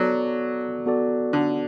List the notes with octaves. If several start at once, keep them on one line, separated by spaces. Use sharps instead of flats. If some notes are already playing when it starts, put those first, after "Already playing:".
Already playing: F#3 B3 F#4 A4 D5
B3 F#4 A4 D5
D3